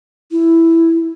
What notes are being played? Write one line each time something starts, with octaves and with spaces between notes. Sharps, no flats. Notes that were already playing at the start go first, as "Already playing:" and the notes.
E4